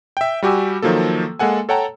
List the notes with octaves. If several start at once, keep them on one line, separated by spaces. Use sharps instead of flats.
E5 G5
G3 F#4 G4 G#5 E6
D#3 F3 F#3 A#3 A4
G#3 A#3 A4 F#5 G#5
A4 C#5 F#5 G5 A5 A#5